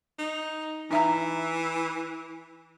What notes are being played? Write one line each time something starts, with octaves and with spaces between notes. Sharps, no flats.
D#4
E3 D#4 E5 A#5